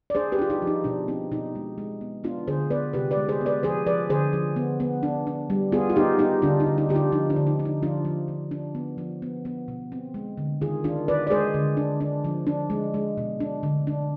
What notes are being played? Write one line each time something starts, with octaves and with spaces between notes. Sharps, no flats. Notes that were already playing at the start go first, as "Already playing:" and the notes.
D5
D4 G#4 C5
G4 B4
D4 F4
D#4 G4
F3
D#4
B2 D4
C4 D#4
B2 D#4
G#3
G#3
B3
B3 D4 F4
D3 G#4 C5
B3 B4 D5
C3 G4 B4
B4 D5
G#3
G#4 C5
B3
B4 D5
F3 G#4 C5
F3 B4 D5
D3 G#4 C5
F3
B3
B3
D4
D4
G3
B3 F4 G#4
F4
B3 D#4 G4
B3 D#4 G4
D3 D4 F4
D#4
D3
D#4
D3 G4
D4 F4
F3 D#4
D4
D3
D#4
D4
D#4
F3 D4 F4
F3
F3
D4
B3
F3
B3
B3
B2
C4
G#3
D3
D#3 F4 G#4
D#3 D4 F4
D#3 B4 D5
D5
G#3 G#4 C5
D3
D4
D4
F3
D4
G#3
G#3
B2
D4
D3
D4